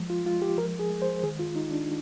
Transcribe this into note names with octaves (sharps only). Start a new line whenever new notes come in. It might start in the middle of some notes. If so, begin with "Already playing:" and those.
Already playing: F3 G#3
F4
G#3 F4
G4
F3 A#4
G#4
G#3
C5
D#3 G#4
F4
G#3 D#4
D4